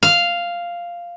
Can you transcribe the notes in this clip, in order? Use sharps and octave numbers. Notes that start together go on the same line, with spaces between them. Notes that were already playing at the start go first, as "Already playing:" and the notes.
F5